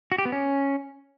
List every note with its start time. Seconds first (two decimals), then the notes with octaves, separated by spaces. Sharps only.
0.12 F#4
0.18 G4
0.25 B3
0.32 C#4